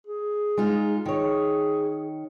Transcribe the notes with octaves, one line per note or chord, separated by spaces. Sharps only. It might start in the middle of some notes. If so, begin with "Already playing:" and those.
G#4
G#3 D#4 F4
D#3 G#4 C#5